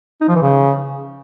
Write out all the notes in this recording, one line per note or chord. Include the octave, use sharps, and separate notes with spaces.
D#4
F3
E3
C#3